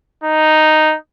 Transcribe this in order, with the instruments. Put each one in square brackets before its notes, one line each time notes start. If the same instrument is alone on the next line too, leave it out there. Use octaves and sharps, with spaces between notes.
[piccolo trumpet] D#4